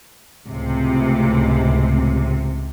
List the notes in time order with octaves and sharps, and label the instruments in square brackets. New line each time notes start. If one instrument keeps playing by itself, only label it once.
[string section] C#2 A2 C3